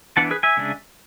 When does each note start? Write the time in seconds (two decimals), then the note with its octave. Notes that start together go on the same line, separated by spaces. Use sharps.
0.17 E3 B3 D4 F#5 A5
0.31 G#4 B4
0.43 E5 G#5
0.57 C#3 G#3 D4